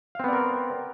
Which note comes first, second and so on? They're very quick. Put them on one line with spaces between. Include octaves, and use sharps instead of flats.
F5 C4 B3 D5 A#4